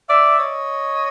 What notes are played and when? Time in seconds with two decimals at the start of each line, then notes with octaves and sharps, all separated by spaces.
0.09 D5 E5
0.39 C#5 D#5